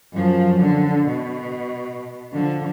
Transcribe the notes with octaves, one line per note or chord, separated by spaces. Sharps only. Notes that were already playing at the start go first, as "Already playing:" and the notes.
F#2 F3
D3
B2
D3 F3